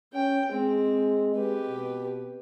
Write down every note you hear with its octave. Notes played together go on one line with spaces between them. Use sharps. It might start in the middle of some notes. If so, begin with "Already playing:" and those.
C#4 G5
G#3 C4
G#3 G4 B4
B2